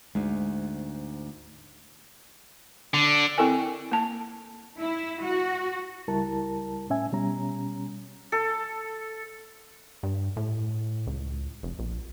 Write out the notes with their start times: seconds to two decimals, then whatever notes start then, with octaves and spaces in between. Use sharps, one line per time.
0.15 D2 G#2 G#3
2.94 D3
3.38 C4 E4 A4 A#4 G#5
3.92 A#3 A5
4.80 E4
5.24 F#4
6.08 C#2 G3 E4 A#4 A5
6.90 A2 C#4 E5 G#5
7.12 B2 G3 C#4 A#5
8.32 A4
10.03 G2
10.37 A2
11.07 C#2
11.63 F1
11.79 A#1